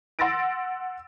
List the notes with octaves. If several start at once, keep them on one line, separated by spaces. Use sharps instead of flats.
F#5 C6 E6 A6 A#6 D7